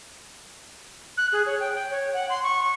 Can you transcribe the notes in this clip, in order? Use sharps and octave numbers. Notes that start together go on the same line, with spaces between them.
F#6
G#4
C#5
G5
G5
C#5
F#5
C6
C#6
C#6